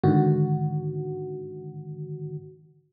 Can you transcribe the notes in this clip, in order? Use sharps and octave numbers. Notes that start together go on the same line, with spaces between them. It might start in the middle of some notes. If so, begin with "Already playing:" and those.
G#2 D3 D#3 F#4